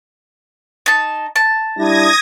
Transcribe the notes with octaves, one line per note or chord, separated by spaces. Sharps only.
D#4 A5
A5
G3 D4 E4 D#6 G#6 A#6